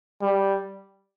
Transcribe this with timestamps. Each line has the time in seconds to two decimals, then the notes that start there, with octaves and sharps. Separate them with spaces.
0.21 G3